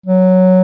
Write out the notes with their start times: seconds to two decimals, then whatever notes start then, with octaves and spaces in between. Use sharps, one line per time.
0.06 F#3